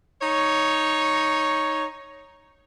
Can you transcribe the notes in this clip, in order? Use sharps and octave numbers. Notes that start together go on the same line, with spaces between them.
D#4 C#5